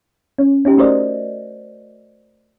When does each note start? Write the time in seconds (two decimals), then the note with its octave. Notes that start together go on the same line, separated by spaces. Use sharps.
0.38 C#4
0.65 C#4 D#4 G4
0.78 A3 F#4 A#4 C5 D5 D#5